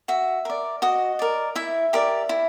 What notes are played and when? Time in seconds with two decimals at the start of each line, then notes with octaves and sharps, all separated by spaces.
0.08 F#4 E5
0.45 A#4 D5
0.82 F#4 D#5
1.19 A#4 D5
1.55 E4 E5
1.93 G4 A#4 D5
2.29 E4